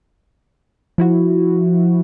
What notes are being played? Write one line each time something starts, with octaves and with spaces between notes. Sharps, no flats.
F3 E4 F#4